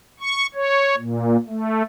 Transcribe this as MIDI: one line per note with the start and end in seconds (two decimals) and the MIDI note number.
0.20 0.46 85
0.55 0.96 73
0.97 1.37 46
1.49 1.83 57